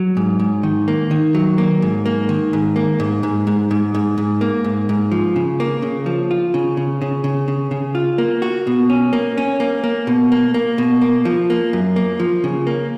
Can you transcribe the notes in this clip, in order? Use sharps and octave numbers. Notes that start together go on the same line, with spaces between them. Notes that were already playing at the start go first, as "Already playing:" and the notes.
Already playing: F#3
G#2
G#2
D#3
A#3
D#3
F#3
A#3
G#2
A#3
D#3
G#2
A#3
G#2
G#2
G#2
G#2
G#2
G#2
A#3
G#2
G#2
F3
C#3
A#3
C#3
F3
F4
C#3
C#3
C#3
C#3
C#3
C#3
F4
A#3
F#4
B2
C#4
A#3
C#4
A#3
A#3
B2
A#3
A#3
B2
A#3
F3
A#3
F#2
A#3
F3
C#3
A#3